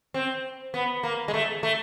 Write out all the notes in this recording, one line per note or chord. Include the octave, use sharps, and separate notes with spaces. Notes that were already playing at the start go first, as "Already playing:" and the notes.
C4
B3
A#3
G#3
A3
A3